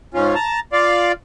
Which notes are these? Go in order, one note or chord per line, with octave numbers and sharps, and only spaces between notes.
G#2 C#4 F4
A5 A#5
F4 D5 F5